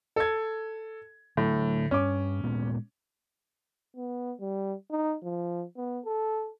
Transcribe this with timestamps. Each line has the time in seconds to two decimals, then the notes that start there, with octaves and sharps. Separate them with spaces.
0.16 A4 G#6
1.37 A2 D3 F#3 A3
1.91 G2 C#4 D6
2.44 A#2 G#3 B3
3.97 B3
4.40 G3
4.91 D#4
5.23 F3
5.77 B3
6.06 A4